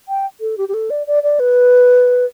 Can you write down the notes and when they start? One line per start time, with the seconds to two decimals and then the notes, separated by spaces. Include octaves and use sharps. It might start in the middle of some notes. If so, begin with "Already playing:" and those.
0.09 G5
0.41 A4
0.58 G4
0.69 G4
0.74 A4
0.90 D5
1.07 D5
1.23 D5
1.40 B4